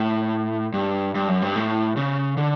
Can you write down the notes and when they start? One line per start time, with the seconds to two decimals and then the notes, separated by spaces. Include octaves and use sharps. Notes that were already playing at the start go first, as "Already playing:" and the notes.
Already playing: A2
0.74 G2
1.15 G2
1.28 F#2
1.42 G2
1.56 A2
1.97 C#3
2.37 D3